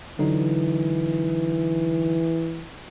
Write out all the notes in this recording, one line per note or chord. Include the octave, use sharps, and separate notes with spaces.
D3 E3 F#3 D#4